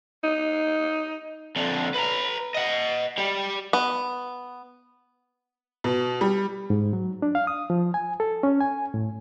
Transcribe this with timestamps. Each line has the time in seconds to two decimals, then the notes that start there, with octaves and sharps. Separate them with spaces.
0.24 D#4
1.56 F2 D3
1.94 B4 A#5
2.55 D#5 F#5
3.18 G3 G4
3.73 B3
5.84 B2
6.21 G3
6.70 G#2
6.93 F#3
7.22 D4
7.35 F5
7.47 D#6
7.70 F3
7.94 G#5
8.20 A4
8.43 C#4
8.61 G#5
8.94 A2